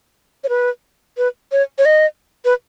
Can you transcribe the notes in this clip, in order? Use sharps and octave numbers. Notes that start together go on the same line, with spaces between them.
C#5
B4
B4
C#5
C#5
D#5
B4